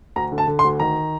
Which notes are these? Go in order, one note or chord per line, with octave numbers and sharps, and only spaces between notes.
D2 A#5
D3
A5
D3
C6
D2
D#3 A#5